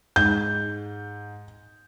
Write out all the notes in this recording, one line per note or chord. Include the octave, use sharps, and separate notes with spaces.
G#2 G6